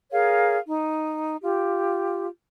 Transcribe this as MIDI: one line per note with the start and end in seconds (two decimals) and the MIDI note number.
0.11 0.57 68
0.11 0.57 70
0.11 0.57 73
0.11 0.57 77
0.67 1.36 63
1.42 2.26 65
1.42 2.26 67